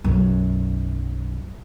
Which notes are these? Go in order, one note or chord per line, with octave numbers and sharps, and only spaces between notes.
B1 F#2